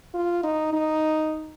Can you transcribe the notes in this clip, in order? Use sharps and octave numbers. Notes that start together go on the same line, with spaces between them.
F4
D#4
D#4